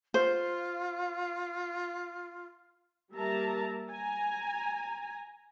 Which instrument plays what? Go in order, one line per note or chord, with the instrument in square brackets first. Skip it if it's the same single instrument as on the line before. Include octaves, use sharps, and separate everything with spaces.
[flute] F4 [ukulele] C5
[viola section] G3 A#3 A#4 E5 A5 A#5
G#5 A#5